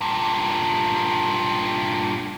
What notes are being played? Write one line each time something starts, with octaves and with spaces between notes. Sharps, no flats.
G2 A#2